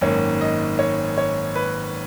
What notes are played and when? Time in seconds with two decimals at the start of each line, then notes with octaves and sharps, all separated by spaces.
0.01 G#1 F#2 D#3 A#3 C#5
0.41 D#5
0.79 C#5
1.18 C#5
1.55 B4